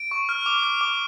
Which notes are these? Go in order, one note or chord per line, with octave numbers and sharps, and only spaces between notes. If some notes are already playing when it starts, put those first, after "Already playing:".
Already playing: D7
C#6
F6
D6
F6
D6